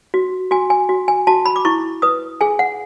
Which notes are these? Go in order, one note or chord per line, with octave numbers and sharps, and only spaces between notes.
F#4
F#4 G#5
G#5
F#4
G#5
F#4 A5
B5
D6
E4 C#6
B4 D#6
G#4 G#5
F#5